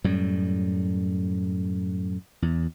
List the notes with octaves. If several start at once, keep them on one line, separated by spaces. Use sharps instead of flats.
F#2 A2 G3
E2